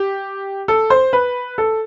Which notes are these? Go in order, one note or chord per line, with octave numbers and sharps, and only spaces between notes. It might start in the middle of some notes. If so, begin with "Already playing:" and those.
Already playing: G4
A4
C5
B4
A4